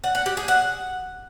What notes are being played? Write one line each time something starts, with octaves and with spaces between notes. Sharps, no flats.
F#5
F#5
G4
G#4
F#5